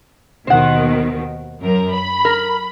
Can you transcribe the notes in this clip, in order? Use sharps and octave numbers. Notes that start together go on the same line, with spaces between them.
D#2 B2 D#3 C5 F#5
F#2 A#4
B5
A#4